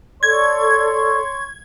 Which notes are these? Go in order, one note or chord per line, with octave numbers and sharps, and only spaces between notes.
A4 C#5 D5 C6 C#6 G#6